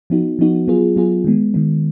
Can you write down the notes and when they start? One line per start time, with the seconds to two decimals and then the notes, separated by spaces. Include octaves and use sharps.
0.10 F3 B3 D#4 F#4
0.39 F3 B3 D#4 F#4
0.68 F#3 B3 F4 G#4
0.96 F#3 B3 F4 G#4
1.24 D#3 G#3 B3
1.54 D#3 G#3 B3